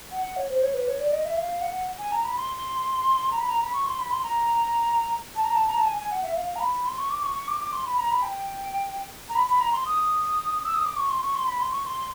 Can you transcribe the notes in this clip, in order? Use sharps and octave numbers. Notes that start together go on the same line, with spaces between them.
F#5
C#5
C5
C#5
B4
C#5
D5
D#5
E5
F5
F#5
G#5
A#5
B5
C6
A#5
B5
A#5
B5
C#6
C6
B5
C6
A#5
A5
A#5
A5
A#5
A5
G#5
G#5
F#5
E5
F5
A#5
B5
C6
C#6
D6
C#6
C#6
D6
D6
C6
B5
A#5
B5
G5
A#5
B5
B5
A#5
C6
D#6
E6
D#6
D6
C#6
C6
C#6
C6
B5
C6
C#6
C6